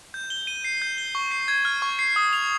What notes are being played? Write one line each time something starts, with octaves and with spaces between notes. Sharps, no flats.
G6
G7
D#7
C7
G6
G7
C#6
C7
G#6
F6
C#6
C7
D#6
F7